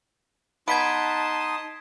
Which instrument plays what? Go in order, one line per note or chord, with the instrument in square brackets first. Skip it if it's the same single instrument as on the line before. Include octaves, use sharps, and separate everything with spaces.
[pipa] B3 [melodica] D#4 C6 D#6 [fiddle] A5 [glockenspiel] G#6 B6 D7